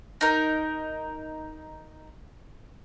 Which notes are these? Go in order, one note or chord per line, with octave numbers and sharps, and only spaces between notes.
D#4 A#4